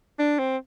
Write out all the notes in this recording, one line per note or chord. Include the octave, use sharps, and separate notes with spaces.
D4
C4